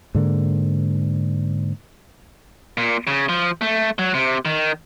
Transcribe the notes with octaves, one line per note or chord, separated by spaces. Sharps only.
G#2 D3 A#3
A#2
C#3
F3
A3
F#3
C3
D#3